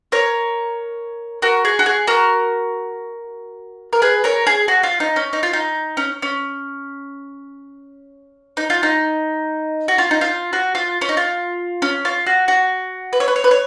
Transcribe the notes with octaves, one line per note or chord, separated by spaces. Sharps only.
A#4 C#5
F#4 A#4
G#4
F#4
G#4
F#4 A#4
A#4
G#4 B4
A#4 C#5
G#4
F#4
F4
D#4
C#4
D#4
F4
D#4
C#4
C#4
D#4
F4
D#4
F#4
F4
D#4
F4
F#4
F4
C#4
D#4
F4
C#4
F4
F#4
F#4
B4
C#5
B4
C#5
B4
C#5